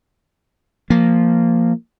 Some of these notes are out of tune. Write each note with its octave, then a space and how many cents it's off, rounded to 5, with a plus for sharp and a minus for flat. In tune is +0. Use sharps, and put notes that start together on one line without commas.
F3 -10 A#3 -10